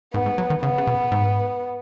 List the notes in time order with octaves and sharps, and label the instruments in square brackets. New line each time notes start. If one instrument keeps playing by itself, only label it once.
[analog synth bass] G#2 [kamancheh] B3
[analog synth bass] G#2
F#3
D#3
[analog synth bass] C#3 [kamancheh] B3
[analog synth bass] C#3
B2
G#2